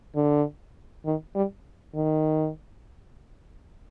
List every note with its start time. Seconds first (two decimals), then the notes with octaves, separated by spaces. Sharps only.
0.16 D3
1.05 D#3
1.35 G3
1.95 D#3